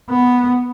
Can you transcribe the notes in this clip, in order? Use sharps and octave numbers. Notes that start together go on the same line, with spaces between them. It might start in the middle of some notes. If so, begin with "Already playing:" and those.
B3